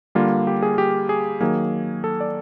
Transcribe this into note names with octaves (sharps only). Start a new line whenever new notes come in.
D3 G3 A#3 F4
G4
G#4
G4
G#4
D#3 F#3 A#3 G#4
A4
D5